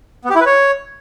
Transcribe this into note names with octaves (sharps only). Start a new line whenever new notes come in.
B3
G4
E4
B4
C#5